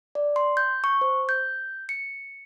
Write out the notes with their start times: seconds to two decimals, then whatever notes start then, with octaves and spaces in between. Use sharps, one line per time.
0.15 D5
0.36 C6
0.57 G6
0.84 C#6
1.01 C5
1.29 G6
1.89 C#7